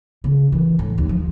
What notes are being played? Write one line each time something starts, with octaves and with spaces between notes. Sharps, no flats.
C#3
E3
A2
D#2
F3